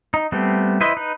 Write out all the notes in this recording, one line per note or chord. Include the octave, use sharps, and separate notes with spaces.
D#4
G3 A3 B3 C4
E4 B4 C5 D#5 E5
D#4 B4